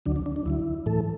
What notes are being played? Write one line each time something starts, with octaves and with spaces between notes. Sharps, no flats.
D2 D3 F#3 D4
D4
D4
D4
D2 D3 F#3 E4
A2 E3 A4